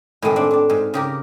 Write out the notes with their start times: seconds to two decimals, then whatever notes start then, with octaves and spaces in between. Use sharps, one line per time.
0.22 A2 C3 D#3 G#3 A3 C4
0.36 C4 D4 C5 D5 G5
0.51 D4 A5
0.70 G#2 F5
0.94 C#3 G4 A#4